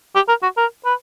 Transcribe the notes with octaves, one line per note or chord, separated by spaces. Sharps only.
G4
A#4
F#4
A#4
B4